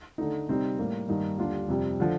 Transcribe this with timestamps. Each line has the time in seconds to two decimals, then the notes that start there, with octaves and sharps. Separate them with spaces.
0.18 D3 A3 D#4
0.48 C3 G3 C4 D#4
0.79 A2 G3 A#3
1.09 G2 D#3 A#3 D#4
1.38 D#2 D3 G3 D4 F4
1.69 F2 C3 G3
2.00 D3 F3